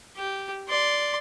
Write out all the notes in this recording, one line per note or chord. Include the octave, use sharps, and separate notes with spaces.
G4
D5 C6